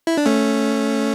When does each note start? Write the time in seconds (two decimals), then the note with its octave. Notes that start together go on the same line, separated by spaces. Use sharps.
0.07 E4
0.17 D4
0.26 A3 C#4